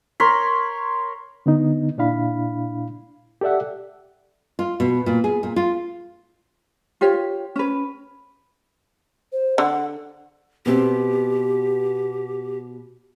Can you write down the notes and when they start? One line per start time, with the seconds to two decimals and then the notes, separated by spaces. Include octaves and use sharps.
0.20 A#4 C#5 B5 C6
1.46 D3 B3 D#4
1.98 A#2 D4 E4 F5 B5
3.41 G4 A4 D5 E5 F#5
4.59 F4
4.80 B2
5.06 A#2
5.24 G#4
5.43 A#2
5.56 F4
7.01 F4 G4 C#5 G5
7.56 C#4 B4
9.32 C5
9.58 D3 F#5
10.66 B2 B3 C4 G4